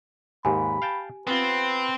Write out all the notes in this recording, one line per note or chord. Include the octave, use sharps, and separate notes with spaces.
D#2 G#2 G4 G#5 B5
F5 G5 A5
B3 C4 F4 B4